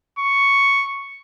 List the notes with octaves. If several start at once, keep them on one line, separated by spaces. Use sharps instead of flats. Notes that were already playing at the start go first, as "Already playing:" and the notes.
C#6